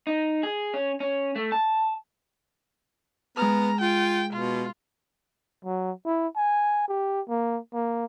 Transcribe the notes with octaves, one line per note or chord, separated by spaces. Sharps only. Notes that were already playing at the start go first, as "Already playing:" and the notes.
D#4
G#4
C#4
C#4
A3
A5
G#3 B3 A#5 F6
F4 G5
B2 F4
F#3
E4
G#5
G4
A#3
A#3